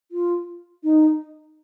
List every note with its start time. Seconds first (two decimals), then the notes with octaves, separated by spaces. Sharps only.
0.12 F4
0.84 D#4